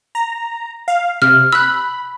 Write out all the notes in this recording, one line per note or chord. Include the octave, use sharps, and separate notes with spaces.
A#5
F5
C3 F6
B5 E6 F#6